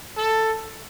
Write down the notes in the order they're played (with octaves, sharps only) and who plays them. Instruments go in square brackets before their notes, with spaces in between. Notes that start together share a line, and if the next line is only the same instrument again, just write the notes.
[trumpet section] A4